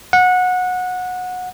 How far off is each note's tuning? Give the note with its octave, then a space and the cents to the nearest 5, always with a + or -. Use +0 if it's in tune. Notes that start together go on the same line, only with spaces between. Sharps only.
F#5 -20